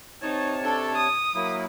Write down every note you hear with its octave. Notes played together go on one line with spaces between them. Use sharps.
C3 D#4 C#5 A5
D4 A4
D#6
F#3 A#3 E4